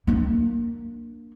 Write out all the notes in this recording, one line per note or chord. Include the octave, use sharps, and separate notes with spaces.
A#3 D4